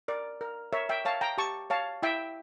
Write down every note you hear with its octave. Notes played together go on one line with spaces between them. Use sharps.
A#4 D5
A#4
A#4 C#5 E5
E5 G5
C#5 F5 A5
G5 A#5
G4 A5 C#6
C#5 F5 A5
E4 E5 G5